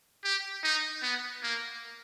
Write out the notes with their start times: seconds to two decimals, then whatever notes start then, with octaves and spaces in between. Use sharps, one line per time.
0.24 G4
0.64 D#4
1.03 B3
1.43 A#3